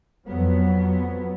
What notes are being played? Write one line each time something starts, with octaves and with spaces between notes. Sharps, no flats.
F2 F#3 B3